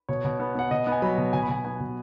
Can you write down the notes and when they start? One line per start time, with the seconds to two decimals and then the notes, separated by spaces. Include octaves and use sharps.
0.09 B2 C#5
0.25 B2
0.40 B3
0.55 B3 F#5
0.71 B2 D#5
0.87 B3
0.92 G#5
1.02 F#3 B5
1.18 B2
1.33 B2 G#5
1.42 B5
1.49 B2 G#5
1.65 B3 G#5
1.80 B2